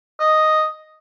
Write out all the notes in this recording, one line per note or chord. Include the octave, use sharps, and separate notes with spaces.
D#5